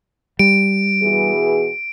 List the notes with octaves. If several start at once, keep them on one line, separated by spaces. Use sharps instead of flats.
G3 D7
B2 E3 G#4